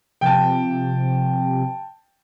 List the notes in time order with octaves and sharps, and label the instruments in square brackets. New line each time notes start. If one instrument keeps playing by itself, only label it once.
[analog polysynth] C3 F3 [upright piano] G5 A5